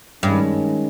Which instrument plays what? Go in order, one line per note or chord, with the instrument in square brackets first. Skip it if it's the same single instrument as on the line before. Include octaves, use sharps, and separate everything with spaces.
[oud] G2 [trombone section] D#3 G#3 C#4